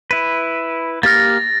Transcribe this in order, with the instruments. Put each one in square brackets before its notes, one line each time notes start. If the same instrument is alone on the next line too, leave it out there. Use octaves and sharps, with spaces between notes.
[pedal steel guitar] E4 B4
[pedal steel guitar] A#3 G4 F6 [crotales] A6 A#6